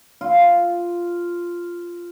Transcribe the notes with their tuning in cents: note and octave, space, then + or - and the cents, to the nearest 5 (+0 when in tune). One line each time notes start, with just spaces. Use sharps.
F4 -5